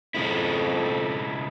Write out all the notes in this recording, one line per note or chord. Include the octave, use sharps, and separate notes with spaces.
F2 C#3 G#3 E4